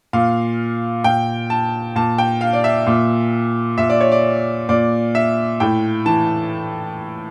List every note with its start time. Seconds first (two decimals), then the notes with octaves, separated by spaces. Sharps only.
0.13 A#2 F5
1.04 A#2 G5
1.50 A5
1.96 A#2 A5
2.18 G5
2.41 F5
2.53 D5
2.64 E5
2.87 A#2
3.78 A#2 E5
3.90 D5
4.01 C#5
4.12 D5
4.69 A#2 D5
5.15 E5
5.60 A2 G5
6.06 E3 A5